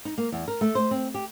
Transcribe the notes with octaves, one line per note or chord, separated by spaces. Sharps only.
D#4
A#3
E2
A#4
A3
C5
C4
G4